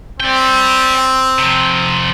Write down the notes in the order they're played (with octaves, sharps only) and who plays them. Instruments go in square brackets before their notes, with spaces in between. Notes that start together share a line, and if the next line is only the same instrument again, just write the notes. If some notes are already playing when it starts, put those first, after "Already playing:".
[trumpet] C4 [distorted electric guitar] D5 G5
[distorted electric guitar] C3 F3